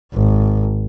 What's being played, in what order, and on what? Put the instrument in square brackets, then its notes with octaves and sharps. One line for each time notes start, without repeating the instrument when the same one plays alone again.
[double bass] G#1